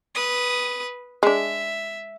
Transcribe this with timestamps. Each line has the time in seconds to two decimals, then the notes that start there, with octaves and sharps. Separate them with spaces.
0.15 B4 D#6
1.23 G#3 D4 E5